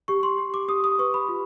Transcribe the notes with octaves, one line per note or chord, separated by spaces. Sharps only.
G4 C#6
C6
G4
D6
G4 D#6
D#6
B4 C#6
B5
F4